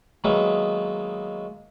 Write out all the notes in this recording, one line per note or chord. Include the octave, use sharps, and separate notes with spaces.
D#3 F#3 G#3 A#3 B3 E4